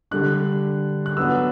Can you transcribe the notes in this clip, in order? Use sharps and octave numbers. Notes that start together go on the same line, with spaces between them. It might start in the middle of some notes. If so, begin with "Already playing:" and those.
D3 G3 D4 F#6
F#6
F#3 B3 D4 E6